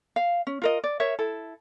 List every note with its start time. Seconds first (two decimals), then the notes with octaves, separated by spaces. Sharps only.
0.16 F5
0.47 C#4
0.62 F4 A#4 D#5
0.84 D5
1.00 A#4 C#5 E5
1.19 E4 A4